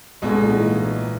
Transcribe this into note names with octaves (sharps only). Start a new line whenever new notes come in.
B1 G#2 B2 G#3
G#2
A#2
E3